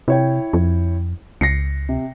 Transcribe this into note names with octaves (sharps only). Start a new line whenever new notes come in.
C3 E4 C#5 G5
F2
C#2 A#6 C7 C#7
C3